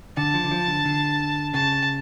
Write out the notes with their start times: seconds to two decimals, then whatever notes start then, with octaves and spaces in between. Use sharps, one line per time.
0.17 D3 A5
0.34 F3
0.44 D3
0.51 F3
0.68 D3
0.85 D3
1.53 C#3 A5